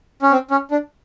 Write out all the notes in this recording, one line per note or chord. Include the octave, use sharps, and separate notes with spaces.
C#4
C4
C#4
D4